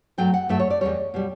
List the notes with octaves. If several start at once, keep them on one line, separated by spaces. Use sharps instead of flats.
G2 F#3 A3 G5
F#5
G2 F#3 A3 E5
C#5
D5
E2 B2 G3 C#5
B2 G3